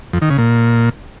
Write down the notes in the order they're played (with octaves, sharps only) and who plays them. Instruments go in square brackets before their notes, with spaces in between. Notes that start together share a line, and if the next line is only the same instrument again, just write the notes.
[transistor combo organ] F2
D#3
C#3
A#2